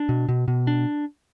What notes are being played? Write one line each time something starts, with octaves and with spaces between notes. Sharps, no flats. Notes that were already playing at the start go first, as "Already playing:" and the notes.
Already playing: D4
B2
B2
B2
D4